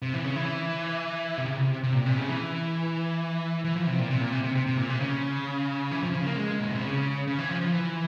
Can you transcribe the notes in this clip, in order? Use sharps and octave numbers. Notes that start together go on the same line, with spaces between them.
C3
E3
C#3
E3
C3
C#3
C3
C3
A#2
C3
C#3
E3
E3
F3
C3
A#2
C3
A#2
C3
C3
C3
C3
A#2
C3
C#3
E3
F3
C#3
A#3
G#3
A#2
C3
C#3
C#3
E3
F3
F3
E3